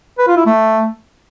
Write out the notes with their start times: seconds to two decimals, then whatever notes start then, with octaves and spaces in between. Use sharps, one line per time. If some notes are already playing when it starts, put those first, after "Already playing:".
0.18 B4
0.28 F4
0.37 E4
0.46 A3